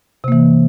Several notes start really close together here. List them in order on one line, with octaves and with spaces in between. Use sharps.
C3 A#3 E3